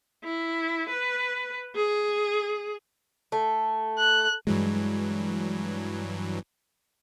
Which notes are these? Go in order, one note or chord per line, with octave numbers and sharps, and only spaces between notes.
E4
B4
G#4
A3
F#6
G2 E3 F#3 G#3